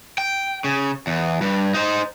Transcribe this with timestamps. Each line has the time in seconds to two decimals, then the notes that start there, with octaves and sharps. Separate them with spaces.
0.18 G5
0.64 C#3
1.07 E2
1.41 G2
1.74 D#4 C5